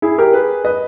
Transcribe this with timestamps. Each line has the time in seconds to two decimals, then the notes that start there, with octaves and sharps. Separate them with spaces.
0.02 E4 G#4
0.18 G4 A#4
0.33 G#4 B4
0.65 B4 D#5